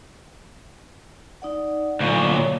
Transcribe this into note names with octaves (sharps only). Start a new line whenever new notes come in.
D#4 D5 F#5
D2 A#2 F#3 C#6
C#5